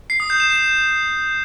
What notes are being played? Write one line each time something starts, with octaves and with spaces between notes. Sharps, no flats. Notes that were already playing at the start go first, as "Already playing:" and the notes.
C7
D#6
G6
E7
E7